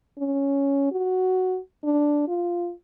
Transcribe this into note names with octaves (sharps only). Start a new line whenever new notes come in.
C#4
F#4
D4
F4